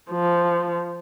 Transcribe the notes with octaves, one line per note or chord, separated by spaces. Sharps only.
F3